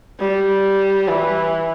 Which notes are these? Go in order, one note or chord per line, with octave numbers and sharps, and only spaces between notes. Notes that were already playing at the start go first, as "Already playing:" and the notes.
G3
E3